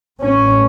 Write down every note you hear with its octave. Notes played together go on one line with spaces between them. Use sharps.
A1 G2 C#4